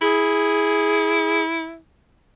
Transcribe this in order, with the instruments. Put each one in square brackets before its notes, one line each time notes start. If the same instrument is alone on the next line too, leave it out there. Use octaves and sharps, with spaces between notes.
[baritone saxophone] E4 [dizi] G#4